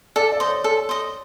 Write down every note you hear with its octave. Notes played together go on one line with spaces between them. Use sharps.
A4 D5
D5
C5 D#5
C#5
A4
C5 D#5